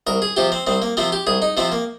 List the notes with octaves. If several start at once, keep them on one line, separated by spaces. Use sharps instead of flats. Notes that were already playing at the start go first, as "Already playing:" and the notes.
C2 A#4
G#4
C3 F3 G4
C4
C2 C4
A#3
C3 F3 C4
G4
C2 G#4
D#4
C3 F3 C4
A#3